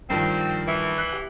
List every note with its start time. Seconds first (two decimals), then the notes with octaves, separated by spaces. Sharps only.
0.10 G2 D#3 F3 C4
0.68 E3
0.98 F#6
1.13 G4